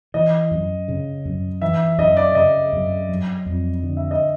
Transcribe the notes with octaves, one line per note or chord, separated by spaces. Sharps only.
E3 D#5
F#2
C#3
F#2
E3 E5
F#2 D#5
D5
C#3 D#5
F#2
F#3
F2
D3
E5
D#5